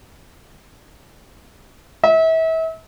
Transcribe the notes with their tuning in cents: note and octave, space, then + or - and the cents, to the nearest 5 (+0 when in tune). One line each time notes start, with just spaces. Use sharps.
E5 -35